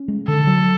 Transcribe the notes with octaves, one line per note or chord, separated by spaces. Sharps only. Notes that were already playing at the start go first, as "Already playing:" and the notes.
Already playing: C#4
G#3
D3 A4
F#3